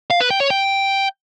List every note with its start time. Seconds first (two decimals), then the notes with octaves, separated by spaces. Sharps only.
0.10 F5
0.20 B4
0.30 G5
0.40 C#5
0.50 G5